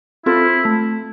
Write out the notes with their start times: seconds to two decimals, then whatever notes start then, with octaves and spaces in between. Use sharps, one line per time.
0.26 C4 E4 F4 A4
0.65 A3